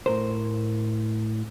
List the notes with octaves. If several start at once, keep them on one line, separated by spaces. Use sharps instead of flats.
A2 A#4 C5